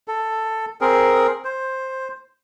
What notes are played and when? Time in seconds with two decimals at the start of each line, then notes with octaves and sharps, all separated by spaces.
0.08 A4
0.81 C4 G#4 A#4
1.45 C5